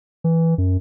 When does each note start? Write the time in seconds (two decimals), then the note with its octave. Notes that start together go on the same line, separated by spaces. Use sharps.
0.24 E3
0.58 F#2